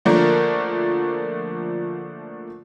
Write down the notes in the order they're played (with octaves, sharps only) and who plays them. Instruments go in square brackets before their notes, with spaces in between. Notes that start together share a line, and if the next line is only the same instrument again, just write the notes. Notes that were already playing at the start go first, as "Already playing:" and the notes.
[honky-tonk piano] D3 F3 A3 A#3 D4 A#4